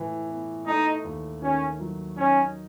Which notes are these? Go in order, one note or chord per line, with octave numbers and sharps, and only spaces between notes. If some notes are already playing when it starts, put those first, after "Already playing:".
Already playing: A2 E3
B3
A3 D#4
D#2
D#3 C#4
F#3
C#4 D#4